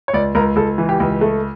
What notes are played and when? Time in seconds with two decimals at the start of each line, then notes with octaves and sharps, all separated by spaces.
0.08 C#5
0.14 C#2 D5
0.35 C#2 A#4
0.56 C#2 A4
0.78 E3
0.89 G4
1.00 C#2
1.21 A3